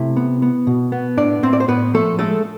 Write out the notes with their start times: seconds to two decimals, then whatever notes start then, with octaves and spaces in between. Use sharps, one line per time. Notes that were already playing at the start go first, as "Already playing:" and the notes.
Already playing: C3 A3 E4
0.16 B3
0.42 B3
0.67 B2
0.92 B3
1.18 A2 D4 D5
1.43 A2 C4 C5
1.53 D5
1.60 C5
1.68 A2 B3 B4
1.94 F3 A3 A4
2.19 G#3 A3 A4